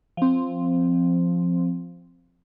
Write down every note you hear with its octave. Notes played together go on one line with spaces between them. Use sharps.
F3 C4